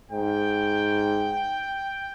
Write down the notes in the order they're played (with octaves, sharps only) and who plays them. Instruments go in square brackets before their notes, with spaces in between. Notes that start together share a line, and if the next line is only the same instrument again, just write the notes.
[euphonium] G#2 [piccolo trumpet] G5